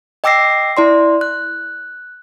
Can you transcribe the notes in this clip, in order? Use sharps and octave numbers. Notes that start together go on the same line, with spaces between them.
D#5 G5 D6 E6 A#6 C7
E4 D5 C6
F#6